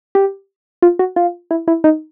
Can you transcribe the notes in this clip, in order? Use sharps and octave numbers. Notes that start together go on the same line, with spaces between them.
G4
F4
F#4
F4
E4
E4
D#4